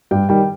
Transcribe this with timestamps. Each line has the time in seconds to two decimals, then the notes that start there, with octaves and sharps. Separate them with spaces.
0.11 G2 G5
0.29 D#3 G3 G5